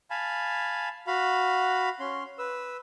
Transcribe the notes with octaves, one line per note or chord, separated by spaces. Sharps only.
F5 G#5 A5 B5
F#4 F5 B5
C#4 C6
B4 E6